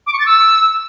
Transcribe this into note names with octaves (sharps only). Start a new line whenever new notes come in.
D6
C#6
A6
E6